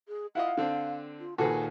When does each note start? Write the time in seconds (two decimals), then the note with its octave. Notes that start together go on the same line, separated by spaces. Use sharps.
0.08 G#4
0.35 E4 F4 D#5 F5 F#5
0.57 D3 C4 D4
1.20 F4
1.38 D#2 A#2 F#4 G#4 A4 B4 G#5